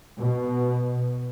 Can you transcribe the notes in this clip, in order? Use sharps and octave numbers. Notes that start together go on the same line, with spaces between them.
B2